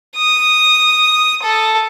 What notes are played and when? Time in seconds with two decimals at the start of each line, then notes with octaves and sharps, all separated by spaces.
0.16 D#6
1.43 A4